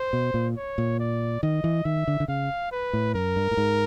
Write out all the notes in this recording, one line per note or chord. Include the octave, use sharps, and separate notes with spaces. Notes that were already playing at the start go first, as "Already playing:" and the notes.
Already playing: C5
B2
A#2
C#5
A#2
D5
D#3 D#5
E3
D#3 E5
D3
D3
C#3 F5
B4
A2
F#2 A#4
G2
A2
G#2